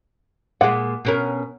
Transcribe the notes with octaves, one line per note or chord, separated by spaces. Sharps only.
A#2 G#3 F#5
B2 C#4 A#4